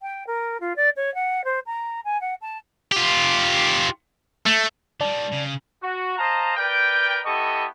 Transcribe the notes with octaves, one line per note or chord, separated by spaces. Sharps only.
G5
A#4
F4
D5
C#5
F#5
C5
A#5
G#5
F#5
A5
F4 G4
A3
D#3 G3 D5 A5
C#3
F#4
C5 D#5 F5 A5 A#5
A#4 B4 D5 G5
B3 E4 G4 A4 D#5 C#6